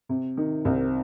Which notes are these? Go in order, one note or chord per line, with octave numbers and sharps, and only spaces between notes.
C3
D#3
C2 C4 D#4